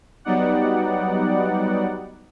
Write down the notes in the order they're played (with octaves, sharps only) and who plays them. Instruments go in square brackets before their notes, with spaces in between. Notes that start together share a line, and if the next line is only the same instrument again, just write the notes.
[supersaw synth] F#3 G3 B3 D#4 D5 F#5